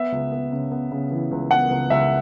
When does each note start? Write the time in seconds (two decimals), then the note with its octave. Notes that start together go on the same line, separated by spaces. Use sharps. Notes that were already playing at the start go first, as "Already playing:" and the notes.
Already playing: B3 E5
0.12 C#2
0.32 B3
0.52 C#3
0.72 B3
0.91 C#3
1.11 E3
1.31 C#2
1.51 B3 F#5
1.70 C#2
1.90 C#2 E5